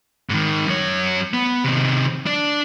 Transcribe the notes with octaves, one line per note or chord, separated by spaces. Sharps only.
G#2 D#3
F#2 C#5
B3
C3 D#3
D4 D5